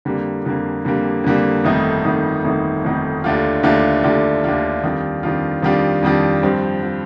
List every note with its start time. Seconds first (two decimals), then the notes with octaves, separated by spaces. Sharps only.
0.05 F2 D3 G3 A#3
0.45 F2 D3 G3 A#3
0.85 F2 D3 G3 A#3
1.24 F2 D3 G3 A#3
1.64 G1 F2 D#3 A3 D#4
2.04 G1 F2 D#3 A3 D#4
2.44 G1 F2 D#3 A3 D#4
2.84 G1 F2 D#3 A3 D#4
3.24 D#2 D3 A3 D4 F4
3.63 D#2 D3 A3 D4 F4
4.04 D#2 D3 A3 D4 F4
4.44 D#2 D3 A3 D4 F4
4.83 F2 D#3 G3 D4 F4
5.23 F2 D#3 G3 D4 F4
5.63 F2 D#3 G3 D4 F4
6.03 F2 D#3 G3 D4 F4
6.43 G2 F3 C4
6.82 F3 C4